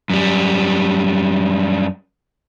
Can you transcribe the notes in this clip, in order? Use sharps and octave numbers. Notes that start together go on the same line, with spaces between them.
F#2 G3